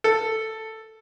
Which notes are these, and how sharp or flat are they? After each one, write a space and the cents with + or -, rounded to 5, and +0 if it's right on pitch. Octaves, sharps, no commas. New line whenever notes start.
A4 +5